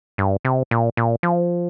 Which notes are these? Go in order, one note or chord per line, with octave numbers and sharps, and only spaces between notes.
G2
C3
A#2
A#2
F3